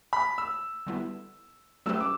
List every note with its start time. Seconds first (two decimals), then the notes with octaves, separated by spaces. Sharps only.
0.13 B5
0.38 E6
0.87 D3 G3 B3 E4 A4
1.86 F#3 A3 C#4 G4 B4 E6
2.01 D6